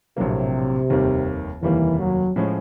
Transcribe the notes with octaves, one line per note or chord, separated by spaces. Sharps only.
A#1 A2 C3 F#3 A#3
F1 D#2 D#3 G3 A#3
F1 D#2 D#3 E3 G3 A#3
F#3
A2 F3 G#3 C#4